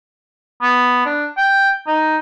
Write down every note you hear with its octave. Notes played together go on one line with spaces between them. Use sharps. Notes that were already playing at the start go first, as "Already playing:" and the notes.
B3
D4
G5
D#4